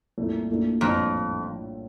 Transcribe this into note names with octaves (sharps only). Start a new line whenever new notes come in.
C2 A#2 A3
A#1 A#2 F3 A3 D4
A#1 F2 A2 G3 D4 F4